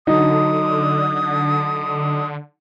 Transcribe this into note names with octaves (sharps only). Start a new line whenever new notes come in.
D3 F#3 D#4 D#6